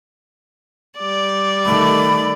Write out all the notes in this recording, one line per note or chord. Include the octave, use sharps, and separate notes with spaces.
G3 D5 D6
D#3 A3 B5